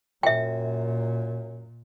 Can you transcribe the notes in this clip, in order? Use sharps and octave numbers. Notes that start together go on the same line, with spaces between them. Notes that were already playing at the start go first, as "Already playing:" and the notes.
F#2 A#2 E5 G5